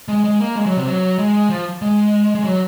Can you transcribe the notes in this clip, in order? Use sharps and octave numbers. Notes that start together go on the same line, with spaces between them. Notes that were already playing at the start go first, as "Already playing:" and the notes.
G#3
G#3
A#3
G#3
F#3
C3
F#3
G#3
F3
G#3
G#3
F#3